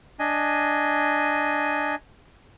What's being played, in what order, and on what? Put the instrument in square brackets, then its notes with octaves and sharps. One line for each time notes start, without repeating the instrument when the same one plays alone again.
[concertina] D4 D#5 G#5